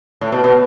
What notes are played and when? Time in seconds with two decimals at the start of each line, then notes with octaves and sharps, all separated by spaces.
0.21 A2
0.32 B2
0.44 B2